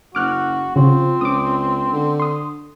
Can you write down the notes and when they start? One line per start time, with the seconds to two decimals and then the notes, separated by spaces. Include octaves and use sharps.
0.15 F#1 F#4 D6 F6 F#6
0.76 C#3 F3 C4
1.21 C#2 D6 D#6
1.93 D3
2.20 C6 D#6